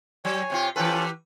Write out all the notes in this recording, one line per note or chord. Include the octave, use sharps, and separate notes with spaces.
F#3 C#5 G#5
C3 C4 F4
E3 C#4 F4 G4 A4 B4